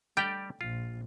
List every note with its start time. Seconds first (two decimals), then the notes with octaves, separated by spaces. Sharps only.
0.17 G3 G4 D5 G5
0.61 A#1 F4